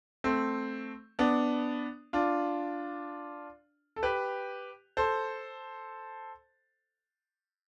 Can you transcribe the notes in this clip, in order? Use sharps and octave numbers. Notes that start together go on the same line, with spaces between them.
A3 C4
B3 D4
D4 F4
A4
G4 B4
A4 C5